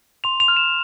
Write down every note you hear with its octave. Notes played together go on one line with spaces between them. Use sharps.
C6 F7
F7
F6
E7